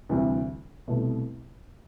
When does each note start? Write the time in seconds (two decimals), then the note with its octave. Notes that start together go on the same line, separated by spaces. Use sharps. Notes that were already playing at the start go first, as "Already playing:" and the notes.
0.09 D2 C3 E3 G3 D4
0.88 C2 B2 A3